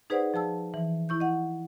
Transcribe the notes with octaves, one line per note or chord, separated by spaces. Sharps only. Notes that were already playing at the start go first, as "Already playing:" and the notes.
D#4 G#4 B4 C5 D5 F#5
F3 G#4 A5 E6
E3
E4 C#6 G6
D#5 F#5